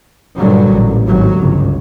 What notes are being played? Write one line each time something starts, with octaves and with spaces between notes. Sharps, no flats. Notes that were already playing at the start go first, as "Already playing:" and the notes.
G2 A#2 D3 F#3 G3
A1
G#1 F#3
G1 C#2